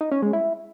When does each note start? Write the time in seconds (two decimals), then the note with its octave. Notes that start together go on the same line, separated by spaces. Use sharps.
0.01 D#4
0.12 C#4
0.22 G#3
0.33 E4